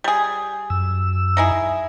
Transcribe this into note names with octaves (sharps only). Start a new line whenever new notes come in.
G3 G#4
F#2 E6
D#4 E4 G#4